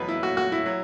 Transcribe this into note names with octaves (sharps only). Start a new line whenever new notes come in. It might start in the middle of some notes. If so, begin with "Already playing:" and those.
Already playing: E2 B2 F#3 B4
E4
F#4
F#4
E4
F#3